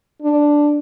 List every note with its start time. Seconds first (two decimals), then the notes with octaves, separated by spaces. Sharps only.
0.22 D4